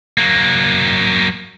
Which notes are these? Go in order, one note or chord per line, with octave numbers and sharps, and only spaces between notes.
F#3 A#3